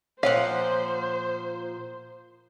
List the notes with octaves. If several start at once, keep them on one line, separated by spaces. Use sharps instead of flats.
A#2 F3 C5 C#5 F5 F#5